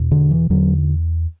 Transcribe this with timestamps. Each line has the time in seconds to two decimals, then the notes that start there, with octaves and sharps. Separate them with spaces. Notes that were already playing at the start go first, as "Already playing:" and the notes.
Already playing: E2 B2
0.11 D3
0.31 E3
0.50 E2 D3 F#3